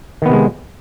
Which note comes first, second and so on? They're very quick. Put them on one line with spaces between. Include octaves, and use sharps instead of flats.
D#3 B3 C3 G#3